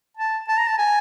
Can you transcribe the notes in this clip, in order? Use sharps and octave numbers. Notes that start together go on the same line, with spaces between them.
A5
A5
A#5
A5
G#5